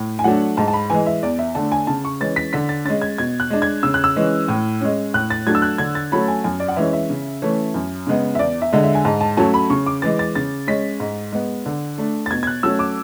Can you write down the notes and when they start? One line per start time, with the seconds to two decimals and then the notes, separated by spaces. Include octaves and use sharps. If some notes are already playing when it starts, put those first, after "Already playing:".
Already playing: A2
0.19 G#5
0.24 F#3 A3 D4 F#5
0.57 G#2 A5
0.68 A5
0.73 B5
0.90 E3 G#3 G#5
1.06 E5
1.22 E2 D5
1.39 E5
1.55 D3 A3 D4 A5
1.72 G#5
1.87 C#3 A5
2.05 C#6
2.20 E3 G#3 C#4 A6
2.36 B6
2.53 D3 B6
2.69 A6
2.85 G#3 C#4 A6
3.02 G#6
3.18 B2 G#6
3.40 F#6
3.50 G#3 D4
3.62 G#6
3.83 C#3 E6
3.94 F#6
4.04 E6
4.16 E3 G#3 C#4
4.48 A2
4.81 G#3 C#4
5.14 A2 F#6
5.30 A6
5.47 F#3 A3 D4 G#6
5.55 E6
5.62 F#6
5.78 D3 G#6
5.95 A6
6.12 F#3 A3 C#4 B5
6.28 G#5
6.44 F#2 G#5
6.60 D5
6.68 F#5
6.76 E3 G#3 C#4 E5
6.93 E5
7.10 C#3
7.42 E3 A3 C#4
7.74 F#2
8.07 C#3 G#3 B3
8.35 E5
8.39 E2 D5
8.62 E5
8.73 D3 G#3
8.84 E5
8.95 G#5
9.05 G#2 A5
9.21 A5
9.37 F#3 A3 C#4 A5
9.54 B5
9.70 C#3 C#6
9.86 D6
10.02 E3 G#3 A6
10.19 A6
10.35 C#3 A6
10.67 G#3 C#4 B6
11.00 G#2
11.32 G#3 B3
11.66 D3
11.98 A3 D4
12.26 A6
12.31 B2 G#6
12.43 G#6
12.47 F#6
12.63 F#3 A3 C#4 E6
12.79 D6